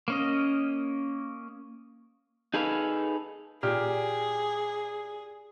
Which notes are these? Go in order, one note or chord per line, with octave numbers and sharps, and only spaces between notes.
A#3 C#4 D#5
D#4 G#4 A4 B4 F5
A#2 G4 G#4 F6